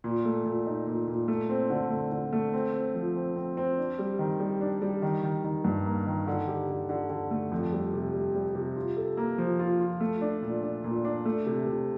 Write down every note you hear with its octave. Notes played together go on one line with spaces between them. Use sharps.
A#2
A3
A#2
D#4
A#2
A#2
A3
C4
D3
A3
D3
A3
C4
C4
F3
C4
C4
C4
D4
G3
D#3
G3
D4
G3
D#3
D#3
D#3
G2
A#3
D#3
D3
G4
D3
D3
D3
A3
F2
G3
C3
G3
G3
C3
F4
A4
A#3
F3
F4
F4
A3
D4
A#2
D4
A#2
D4
A3
C3
C3